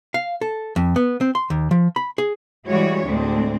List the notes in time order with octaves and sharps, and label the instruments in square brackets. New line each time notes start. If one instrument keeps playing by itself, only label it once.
[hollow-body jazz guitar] F5
A4
F2
B3
C4
C6
D#2
F3
B5
G#4
[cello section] E3 G3 G#3 E4 F#4 C#5
D2 A2 G#3 C4 D4